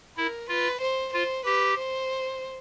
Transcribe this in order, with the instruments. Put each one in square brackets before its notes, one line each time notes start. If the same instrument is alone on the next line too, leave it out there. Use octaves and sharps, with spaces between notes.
[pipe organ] E4 [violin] A#4
[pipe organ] F4 [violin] B4
[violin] C5
[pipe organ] F4 [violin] C5
[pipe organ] G4 [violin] B4
[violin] C5